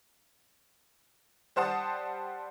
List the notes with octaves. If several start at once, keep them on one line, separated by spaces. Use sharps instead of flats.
G3 C5 F#5 A5 D#6